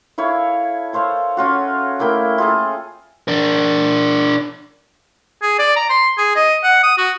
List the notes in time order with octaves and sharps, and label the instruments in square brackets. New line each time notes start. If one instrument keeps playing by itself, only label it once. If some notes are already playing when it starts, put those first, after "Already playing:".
[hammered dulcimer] E4 A4 C#5 F5
A4 C5 C#5 F5
C#4 F4 F#4
A3 A#3 E4 G5
F4 G#4 A4
[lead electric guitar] D4 A#4
[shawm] G#4
D5
A#5
C6
G#4
D#5
F#5
D#6
F#4